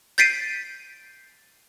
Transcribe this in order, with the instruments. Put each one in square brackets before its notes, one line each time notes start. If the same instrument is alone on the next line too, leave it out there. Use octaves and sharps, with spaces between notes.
[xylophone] G6 A6 B6 C7 D7 D#7